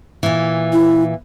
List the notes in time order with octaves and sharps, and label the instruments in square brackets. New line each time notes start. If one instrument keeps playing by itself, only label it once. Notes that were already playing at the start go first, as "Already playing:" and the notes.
[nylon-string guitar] A#2 E3
[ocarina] E4